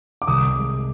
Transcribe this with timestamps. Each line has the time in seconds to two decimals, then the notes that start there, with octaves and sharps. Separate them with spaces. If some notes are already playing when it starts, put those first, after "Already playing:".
0.22 D6
0.27 C2 D#6
0.56 G#3